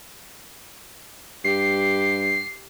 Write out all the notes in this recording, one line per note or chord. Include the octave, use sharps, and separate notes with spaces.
G2 G4 C7